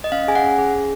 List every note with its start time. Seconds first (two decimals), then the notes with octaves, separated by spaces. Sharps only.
0.04 D#5
0.12 C#4 F5
0.28 G#4 G#5
0.35 F#5
0.43 C#4
0.59 G#4
0.74 C#4